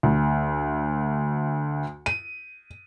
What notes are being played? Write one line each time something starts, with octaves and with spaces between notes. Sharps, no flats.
D2
D#7